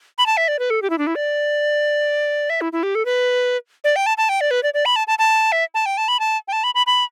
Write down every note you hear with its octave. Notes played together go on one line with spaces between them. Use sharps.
B5
A5
E5
D5
B4
A4
G4
E4
D4
E4
D5
E5
E4
E4
G4
A4
B4
D5
G5
A5
A5
G5
D5
B4
D5
D5
B5
A5
A5
A5
E5
A5
G5
A5
B5
A5
G5
A5
B5
B5
B5